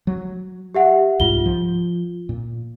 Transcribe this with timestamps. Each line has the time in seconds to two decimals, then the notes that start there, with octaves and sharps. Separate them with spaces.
0.07 F#3
0.75 G4 E5 F#5
1.20 C2 G#2 F4 G7
1.46 F3
2.29 A#2